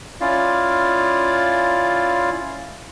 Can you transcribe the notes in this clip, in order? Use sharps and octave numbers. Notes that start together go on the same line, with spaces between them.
C#4 E4 F4 D5 F5